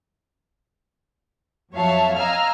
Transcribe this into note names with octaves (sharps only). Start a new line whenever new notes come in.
F2 F#3 C#5 E5 F5 A5
D#5 F5 G#5 A#5 E6 F6